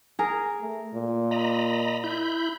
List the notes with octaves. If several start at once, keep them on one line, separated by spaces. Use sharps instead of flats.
G#4 A#4
A3
A#2
D#5 A#5 B5
E4 B5 G6